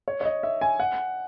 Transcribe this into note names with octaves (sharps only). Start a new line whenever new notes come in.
C#5
C#5
D#5
E5
G#5
F#5